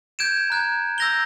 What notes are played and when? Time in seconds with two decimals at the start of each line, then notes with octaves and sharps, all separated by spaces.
0.19 G6 G#6 D7 E7
0.50 A#5 F#6 G#6
0.98 E6 G6 A#6 F7 G7